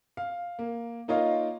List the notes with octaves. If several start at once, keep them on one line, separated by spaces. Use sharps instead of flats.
F5
A#3
A#3 D#4 F4 C#5 D#5 F5